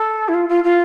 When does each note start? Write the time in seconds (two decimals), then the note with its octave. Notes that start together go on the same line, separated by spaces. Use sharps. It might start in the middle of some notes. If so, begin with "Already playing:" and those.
Already playing: A4
0.28 E4
0.33 F4
0.48 F4
0.63 F4